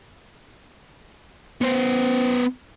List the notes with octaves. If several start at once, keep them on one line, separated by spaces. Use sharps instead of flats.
B3 C5